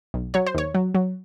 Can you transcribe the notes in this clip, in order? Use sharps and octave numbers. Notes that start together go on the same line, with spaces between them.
B1
F#3 C#5
C5
D#2 C#5
F#3
F#3